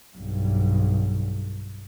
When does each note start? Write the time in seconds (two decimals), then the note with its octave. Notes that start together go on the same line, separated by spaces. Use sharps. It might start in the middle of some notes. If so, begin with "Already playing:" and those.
0.16 B1 G2